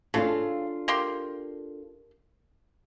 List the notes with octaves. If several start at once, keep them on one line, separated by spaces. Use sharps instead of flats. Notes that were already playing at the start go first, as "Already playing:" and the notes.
C#3 D4 F4 A4
A#3 G4 C6